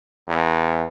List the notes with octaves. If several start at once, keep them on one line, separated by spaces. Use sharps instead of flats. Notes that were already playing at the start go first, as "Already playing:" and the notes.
E2